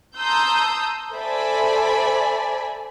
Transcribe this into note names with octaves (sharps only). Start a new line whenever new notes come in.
A5 A#5 C6 D#6 E6 G6
A4 C5 D5 E5 G#5 B5